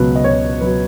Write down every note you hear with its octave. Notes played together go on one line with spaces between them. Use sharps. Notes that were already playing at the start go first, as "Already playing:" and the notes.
Already playing: C#2 B2 F#3 B4
D#5
C#2 C#5
B2 F#3 B4